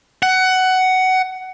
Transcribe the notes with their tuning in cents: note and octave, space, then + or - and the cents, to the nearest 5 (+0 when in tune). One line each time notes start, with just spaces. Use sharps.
F#5 +15